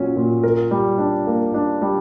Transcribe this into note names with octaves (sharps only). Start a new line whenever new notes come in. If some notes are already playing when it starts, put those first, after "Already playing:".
Already playing: A#2 F#3 C#4
A#2
A#4
G3
D4
A#3
D4
G3